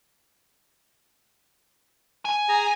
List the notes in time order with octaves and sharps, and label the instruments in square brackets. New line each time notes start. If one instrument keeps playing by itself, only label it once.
[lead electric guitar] G#5
[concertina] G#4 A#5